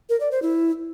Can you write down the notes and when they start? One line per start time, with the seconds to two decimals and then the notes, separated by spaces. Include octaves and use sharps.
0.09 A#4
0.20 D5
0.31 C5
0.42 E4